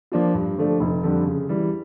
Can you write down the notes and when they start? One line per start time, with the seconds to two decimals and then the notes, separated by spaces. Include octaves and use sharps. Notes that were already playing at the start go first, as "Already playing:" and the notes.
0.12 F3 A#3 D4 F4
0.34 G2
0.58 D3 F3 A3 D4
0.80 F1
1.03 F2 D3 G3 D4
1.26 C#3
1.49 E3 G3